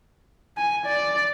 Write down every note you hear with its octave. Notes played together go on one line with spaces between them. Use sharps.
G#5
D5